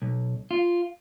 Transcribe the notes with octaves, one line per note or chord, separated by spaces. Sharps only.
B1
F4